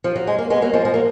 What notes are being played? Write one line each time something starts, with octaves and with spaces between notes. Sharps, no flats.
F3
F#3
G#3
A#3
G#3 B3
F#3 A#3
F3 G#3
F3 G#3
F#3 A#3